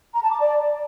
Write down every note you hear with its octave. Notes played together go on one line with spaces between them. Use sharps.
A#5
A5
D6
D5